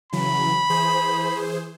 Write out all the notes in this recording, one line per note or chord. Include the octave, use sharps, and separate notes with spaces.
C#3 E3 F#3 B5
E3 G#4 C5